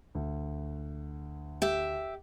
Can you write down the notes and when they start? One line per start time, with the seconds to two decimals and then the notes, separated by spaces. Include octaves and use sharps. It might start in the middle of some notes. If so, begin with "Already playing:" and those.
0.15 D2
1.62 G4 E5